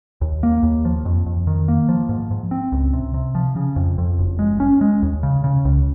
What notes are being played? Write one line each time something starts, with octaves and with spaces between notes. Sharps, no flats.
D#2
A#3
D#2
F3
F2
F2
D#3
A#3
F3
G#2
G#2
C4
C#2
C3
C3
F3
C#3
F2
F2
F#1
G#3
C#4
G#3
D#2
C#3
C#3
C#2